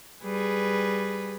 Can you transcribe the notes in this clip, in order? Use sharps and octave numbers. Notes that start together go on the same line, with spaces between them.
G3 G#4 B4